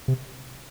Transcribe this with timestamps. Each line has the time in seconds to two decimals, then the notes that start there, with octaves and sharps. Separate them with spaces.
0.08 C3